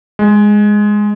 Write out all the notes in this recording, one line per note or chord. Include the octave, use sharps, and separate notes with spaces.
G#3